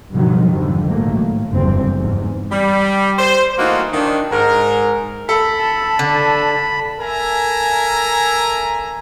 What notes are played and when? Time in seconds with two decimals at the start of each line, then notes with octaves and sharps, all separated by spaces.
0.13 G2 B2 D3 D#3 F3 F#3
0.49 F2 G#2 D3 F3 G3
0.87 A#1 G#2 D#3 F#3 A3 A#3
1.20 A2
1.53 F#1 E2 G2 D3 C4
1.98 E2 G#2
2.52 G3
3.18 C5
3.59 E3 A3 A#3 D#4 F4 F#4
3.94 D#3 D4
4.32 G#2 A#4
5.29 A4 B5
5.60 A5
5.99 D3
7.00 A4 A#4 E5 G#5 A#5